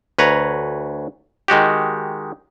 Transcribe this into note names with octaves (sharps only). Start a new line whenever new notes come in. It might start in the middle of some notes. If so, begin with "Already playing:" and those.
D2 B4 C#5 A#5
D#3 G#3 F#4 G4